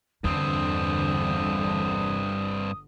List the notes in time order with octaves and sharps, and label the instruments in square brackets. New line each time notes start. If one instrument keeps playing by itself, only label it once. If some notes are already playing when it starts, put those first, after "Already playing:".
[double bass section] G1 D3 [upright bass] E2 [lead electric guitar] G2 C4 [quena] D#6